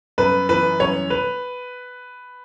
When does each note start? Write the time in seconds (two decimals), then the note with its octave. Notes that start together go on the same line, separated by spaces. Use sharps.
0.18 F#2 B4
0.49 E3 B4
0.80 F#2 C#5
1.10 B4